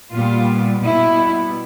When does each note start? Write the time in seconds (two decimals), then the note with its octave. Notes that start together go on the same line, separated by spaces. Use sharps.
0.12 A#2 G3 B3 F4
0.82 B2 G3 B3 E4